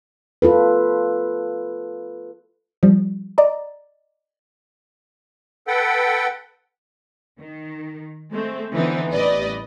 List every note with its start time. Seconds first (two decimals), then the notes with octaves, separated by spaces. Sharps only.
0.42 F4 A4 B4
2.83 F3 G3
3.38 D5 D#5 A#5
5.67 A4 B4 F#5 G5
7.40 D#3
8.31 G#3 A3 C4
8.73 D3 E3 B3 C4 D#4
9.12 A1 G3 B4 D5 D#5